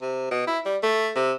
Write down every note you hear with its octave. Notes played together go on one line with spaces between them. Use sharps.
C3
B2
E4
G3
A3
C3